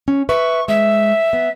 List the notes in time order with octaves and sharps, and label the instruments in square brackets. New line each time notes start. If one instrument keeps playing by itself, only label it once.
[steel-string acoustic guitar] C#4
[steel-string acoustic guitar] B4 E5 [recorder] C#6
[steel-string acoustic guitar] G#3 [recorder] E5
[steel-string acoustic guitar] B3